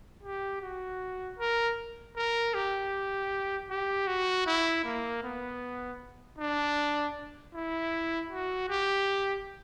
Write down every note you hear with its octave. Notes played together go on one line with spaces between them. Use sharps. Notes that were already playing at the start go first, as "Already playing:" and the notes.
G4
F#4
A#4
A#4
G4
G4
F#4
E4
A#3
B3
D4
E4
F#4
G4